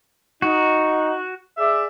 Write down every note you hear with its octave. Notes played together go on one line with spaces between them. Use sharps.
D#4 F#4
G#4 D5 E5